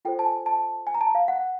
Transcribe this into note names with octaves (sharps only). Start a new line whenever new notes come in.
F4 A4 C5 G5
A5
G#5
A5
G#5
A#5
A5
F5
F#5